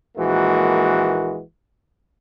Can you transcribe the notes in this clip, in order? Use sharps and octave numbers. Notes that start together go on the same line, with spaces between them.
A#1 E3 G#3 A#3 F#4